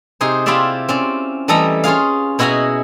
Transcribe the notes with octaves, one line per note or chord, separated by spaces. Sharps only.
C3 D#4 G#4 C5
E4 F4 G4 C5 D5 E5
C4 C#4 D5
E3 G3 A3 A4 D#5 A#5
C#4 F4 G#4 F5
B2 E4 F#4 G#4 D#5 A#5